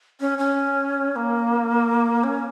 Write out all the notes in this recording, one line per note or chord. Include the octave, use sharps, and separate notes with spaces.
C#4
C#4
C#4
A#3
C#4